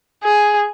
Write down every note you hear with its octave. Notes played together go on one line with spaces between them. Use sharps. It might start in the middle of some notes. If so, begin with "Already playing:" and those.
G#4